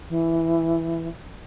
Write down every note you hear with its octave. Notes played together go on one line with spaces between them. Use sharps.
E3